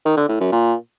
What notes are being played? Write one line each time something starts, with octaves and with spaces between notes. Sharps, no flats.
D#3
D3
A2
F#2
A#2